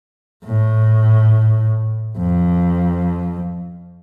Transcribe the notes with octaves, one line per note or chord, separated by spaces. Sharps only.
A2
F2